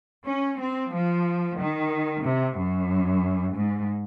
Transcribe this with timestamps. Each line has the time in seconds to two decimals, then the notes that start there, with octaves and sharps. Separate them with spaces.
0.25 C#4
0.59 C4
0.92 F3
1.57 D#3
2.23 C3
2.56 F#2
3.54 G#2